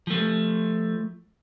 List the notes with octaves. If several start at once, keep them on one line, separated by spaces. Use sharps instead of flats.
F3 A3